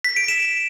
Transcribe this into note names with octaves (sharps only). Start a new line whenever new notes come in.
B6
D7
E7